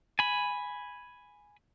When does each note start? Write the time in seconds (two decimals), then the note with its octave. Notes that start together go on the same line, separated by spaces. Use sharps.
0.19 G#5 B5